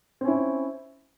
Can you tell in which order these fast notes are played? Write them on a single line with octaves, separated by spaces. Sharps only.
C4 C#4 E4